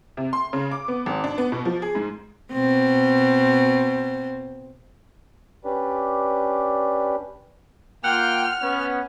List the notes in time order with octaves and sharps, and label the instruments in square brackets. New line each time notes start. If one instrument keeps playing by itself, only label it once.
[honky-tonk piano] C3
C6
C#3
D6
B3
G#1
D4
B3
B2
F3
G#4
G#2
[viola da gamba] B2 C4
[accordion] C#4 D4 G4 B4 D5
[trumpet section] A#3 F4 G5 [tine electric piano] F#5 [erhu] F6
[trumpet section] B3 C#4